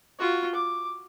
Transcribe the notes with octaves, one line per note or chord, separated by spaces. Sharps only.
F4 F#4
D6